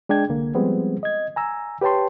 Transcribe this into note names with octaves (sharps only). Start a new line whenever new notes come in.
G#3 D4 G5 G#6
C2 D3 A#3
F3 G3 G#3 B3 C4
D#5 G#6
G#5 A#5 E6
G4 B4 C#5 G5 A5 C6